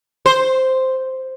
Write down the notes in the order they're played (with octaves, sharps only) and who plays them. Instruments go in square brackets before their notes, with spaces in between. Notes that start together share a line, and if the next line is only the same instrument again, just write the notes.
[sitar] C5